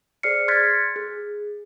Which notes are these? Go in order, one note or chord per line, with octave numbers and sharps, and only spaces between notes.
G#4 C5 D5 F6 C7 C#7
C6 F6 F#6 G#6 A6 B6
G#4